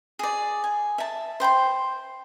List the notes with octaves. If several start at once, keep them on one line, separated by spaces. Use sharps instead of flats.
G#4 D5
G#5
E5 A5
C5 G5 B5 C6